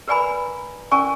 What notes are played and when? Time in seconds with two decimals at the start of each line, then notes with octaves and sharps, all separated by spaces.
0.08 A#4 B4 D5 G#5 A#5 B5
0.91 C#4 A#4 D5 G#5 C#6